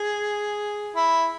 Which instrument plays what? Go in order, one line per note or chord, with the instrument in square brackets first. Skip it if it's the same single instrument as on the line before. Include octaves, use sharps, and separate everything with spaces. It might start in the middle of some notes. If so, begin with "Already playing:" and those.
Already playing: [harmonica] G#4
E4